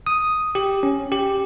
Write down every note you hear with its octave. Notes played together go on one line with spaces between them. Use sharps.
D#6
G4
C#4
G4